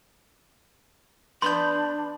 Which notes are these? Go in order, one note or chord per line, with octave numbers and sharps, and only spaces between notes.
B3 D4 B5 C6 G6